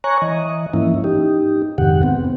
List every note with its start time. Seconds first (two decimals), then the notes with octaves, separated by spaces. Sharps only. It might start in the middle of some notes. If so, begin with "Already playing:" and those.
0.04 C#5 G#5 A#5 C#6 F#6
0.22 E3 D#5
0.73 G#2 E3 F3 A#3 C#4 E4
1.04 D#4 G4
1.78 F2 G#2 C3 D#3 G4 F#5
2.03 B3 C4